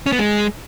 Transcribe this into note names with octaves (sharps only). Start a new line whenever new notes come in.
C#4
B3
G#3